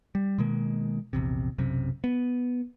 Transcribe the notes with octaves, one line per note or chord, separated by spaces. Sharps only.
G3
B2 D#3 G#3 A#3
A#1 E2 C3
B1 F#2 C3
B3